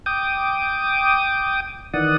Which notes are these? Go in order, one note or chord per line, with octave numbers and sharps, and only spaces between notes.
G5 D6 D#6
D#3 E3 D5 F#5 D#6